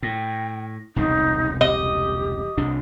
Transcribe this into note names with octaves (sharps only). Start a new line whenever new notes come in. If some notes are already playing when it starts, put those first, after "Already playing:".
A2 G5
E1 C2 C#3 D#4
G4 D#5
C2 C3 D4